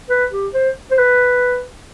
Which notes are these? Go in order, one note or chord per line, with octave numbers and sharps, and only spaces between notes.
B4
G4
C5
C5
B4